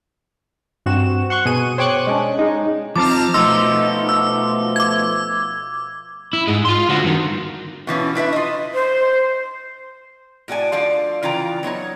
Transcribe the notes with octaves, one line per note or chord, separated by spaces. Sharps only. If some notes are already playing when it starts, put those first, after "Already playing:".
G2 C4 F#4 E7
F#5 C6 C#6 F#6
B2 G#4 D#7
C5 C#5 G5 C#6 D6 F#6
G#3 C#4 D4
G#3 D#4
F3 C4 A5 A#5 D6 F6
B2 F3 A3 D#4 C6 E6
E6
D6 G#6
E4
G#2 G#3
F4 C6
D3 F#4
G2 D#3
B2 E3 F3 C#4
D4 E4 B4 E5
F4 D#5
C5
A2 F#4 D5 G#5
D3 F3 D5 F5
C#3 E3 F4 G5 A#5
F#3 B3 D#4 C#5